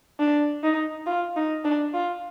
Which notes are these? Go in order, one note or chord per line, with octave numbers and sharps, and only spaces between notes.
D4
D#4
F4
D#4
D4
F4